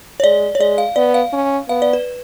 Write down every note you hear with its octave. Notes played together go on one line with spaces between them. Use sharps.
C#5
G#3 D5
C#5
G#3 D5
F5
B3 D5
F5
C#4
B3 F5
D5
B4